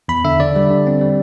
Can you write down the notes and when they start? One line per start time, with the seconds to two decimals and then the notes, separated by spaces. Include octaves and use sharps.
0.08 E2 B5
0.24 D3 E5
0.40 D3 D5
0.56 G3
0.70 D3
0.87 C4
1.01 G3